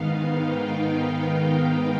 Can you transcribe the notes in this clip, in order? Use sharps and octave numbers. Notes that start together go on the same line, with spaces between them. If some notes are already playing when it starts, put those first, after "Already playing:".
Already playing: G#2 D#3 B3 D#4 F5
G5
F5